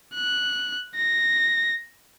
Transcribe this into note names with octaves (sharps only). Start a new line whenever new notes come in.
F#6
A#6